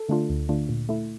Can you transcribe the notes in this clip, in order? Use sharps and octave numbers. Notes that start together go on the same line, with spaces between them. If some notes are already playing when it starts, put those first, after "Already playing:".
Already playing: A4
D3 A3 D4 F4
D2
D3 A3 D4 F4
A#2
A3 E4